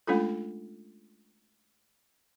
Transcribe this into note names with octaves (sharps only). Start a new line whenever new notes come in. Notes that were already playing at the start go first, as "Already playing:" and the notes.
G#3 A3 C#4 D4 F4 A4